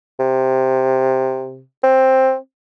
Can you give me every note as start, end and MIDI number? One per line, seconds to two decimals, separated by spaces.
0.20 1.63 48
1.84 2.36 60